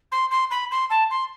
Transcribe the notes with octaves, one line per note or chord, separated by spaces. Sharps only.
C6
C6
B5
C6
A5
C6